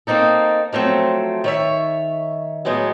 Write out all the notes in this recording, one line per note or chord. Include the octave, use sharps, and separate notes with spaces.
A#3 C4 D#4 A4
F3 F#3 A3 C4
D#3 C#5 E5
A2 F#3 G#3 B3 E4